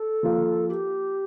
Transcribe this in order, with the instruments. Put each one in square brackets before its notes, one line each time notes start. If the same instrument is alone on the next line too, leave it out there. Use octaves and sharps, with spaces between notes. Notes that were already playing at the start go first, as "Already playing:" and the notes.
Already playing: [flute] A4
[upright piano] F3 A#3 F4
[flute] G4